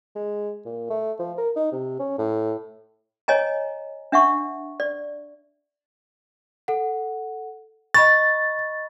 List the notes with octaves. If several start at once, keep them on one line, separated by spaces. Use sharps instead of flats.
G#3
A#2
A3
F3
A#4
D#4
C3
C#4
A2
C#5 D#5 G#5 A#5
D4 E5 F#5 C#6
D5
A4 F#5
D#5 B5 C#6 A6